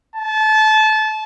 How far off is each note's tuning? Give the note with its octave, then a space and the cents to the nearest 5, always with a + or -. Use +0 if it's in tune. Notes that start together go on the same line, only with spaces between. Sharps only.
A5 -25